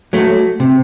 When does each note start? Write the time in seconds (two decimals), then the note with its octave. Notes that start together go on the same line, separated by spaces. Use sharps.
0.13 F#3 A3
0.60 C3